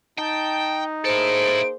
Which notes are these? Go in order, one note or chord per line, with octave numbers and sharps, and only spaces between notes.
D#4 G5 A5
A#3 E4 G#4 A4 C5 D7